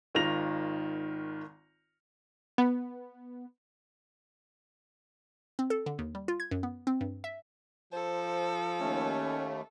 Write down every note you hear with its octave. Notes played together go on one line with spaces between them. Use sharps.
G#1 D#3 F4 A#6 F7
B3
C4
A4
D3
D#2
G3
F4
G#6
F#2
B3
C4
G2
E5
F3 A4 C5
D#2 A3 C#4